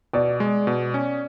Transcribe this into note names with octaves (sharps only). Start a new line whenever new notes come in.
B2 D5
G#3
B2
C#4